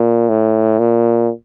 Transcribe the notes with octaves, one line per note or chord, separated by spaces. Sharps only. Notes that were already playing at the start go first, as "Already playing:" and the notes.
Already playing: A#2
A2
A#2